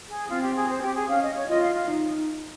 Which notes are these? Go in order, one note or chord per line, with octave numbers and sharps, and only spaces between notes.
G#4
C4 F4
G4
G#4
C5
G4
G#4
C#4 F5
D#5
C#5
F4 D#5
F5
F5
D#4